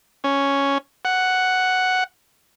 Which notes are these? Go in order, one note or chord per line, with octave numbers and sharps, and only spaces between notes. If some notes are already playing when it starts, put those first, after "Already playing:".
C#4
F#5